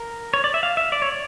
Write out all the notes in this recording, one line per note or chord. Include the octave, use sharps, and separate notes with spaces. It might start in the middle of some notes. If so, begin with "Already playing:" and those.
Already playing: A#4
C#5
D5
E5
F5
E5
D5
C#5
D5